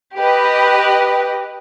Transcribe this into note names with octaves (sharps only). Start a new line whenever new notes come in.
G4 B4 D#5